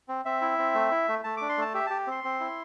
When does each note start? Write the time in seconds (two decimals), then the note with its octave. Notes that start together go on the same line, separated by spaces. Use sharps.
0.08 C4
0.25 C4 E5
0.41 E4
0.59 C4
0.75 A3
0.91 E4
1.08 A3
1.24 A3 A5
1.37 D4 D6
1.49 C6
1.58 A3 A5
1.74 G4 E5
1.86 G4 A5
2.07 C4 C6
2.24 C4
2.40 E4